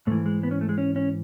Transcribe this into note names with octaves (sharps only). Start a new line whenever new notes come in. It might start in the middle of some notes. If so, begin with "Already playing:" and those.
G#2 E3 A3
G#3
B3
C#4
A3
G#3
C#4
C#4